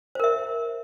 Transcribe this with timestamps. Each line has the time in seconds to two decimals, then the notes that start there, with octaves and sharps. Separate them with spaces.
0.15 C5
0.20 A#4
0.24 E5